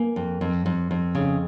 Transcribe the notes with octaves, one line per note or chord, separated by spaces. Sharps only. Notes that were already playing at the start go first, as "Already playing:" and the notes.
Already playing: A#3 G#5
F2
F2
F2
F2
C#3